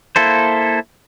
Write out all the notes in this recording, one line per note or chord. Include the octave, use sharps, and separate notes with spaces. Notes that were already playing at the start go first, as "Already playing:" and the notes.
A#3 E4 A4 C5